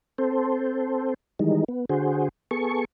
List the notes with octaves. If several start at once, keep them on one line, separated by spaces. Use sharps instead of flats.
C4 A4 C5
D#3 E3 G3 G#3 D#4
B3
D3 F#4 G#4 C5
B3 G#4 A4 C#6